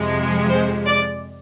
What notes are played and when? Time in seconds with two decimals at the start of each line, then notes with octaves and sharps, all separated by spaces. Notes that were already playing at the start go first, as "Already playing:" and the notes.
Already playing: F2 C3 F3 G#3
0.50 C5
0.87 D5